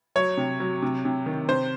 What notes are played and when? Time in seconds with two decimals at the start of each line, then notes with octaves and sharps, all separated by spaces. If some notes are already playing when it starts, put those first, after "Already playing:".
0.16 F#3 C#5
0.37 C3
0.60 F#3
0.82 C3
1.05 C3
1.26 D#3
1.48 C3 C5